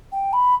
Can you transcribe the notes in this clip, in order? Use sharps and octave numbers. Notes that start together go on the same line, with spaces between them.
G5
B5